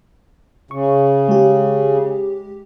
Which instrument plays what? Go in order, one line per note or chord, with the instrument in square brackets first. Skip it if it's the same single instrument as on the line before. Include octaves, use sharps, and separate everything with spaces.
[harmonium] C#3 [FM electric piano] C#6
[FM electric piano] G#3 G4